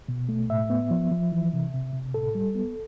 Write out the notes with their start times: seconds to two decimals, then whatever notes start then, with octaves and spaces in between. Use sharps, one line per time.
0.08 B2
0.29 A3
0.49 A2 E5
0.70 B3
0.91 F3
1.11 F3
1.32 E3
1.53 C3
1.74 C3
1.93 C3
2.14 A2 A4
2.35 G3
2.55 B3